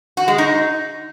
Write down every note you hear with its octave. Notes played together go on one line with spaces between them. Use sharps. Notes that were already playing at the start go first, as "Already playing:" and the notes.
F#4
G#3
D#4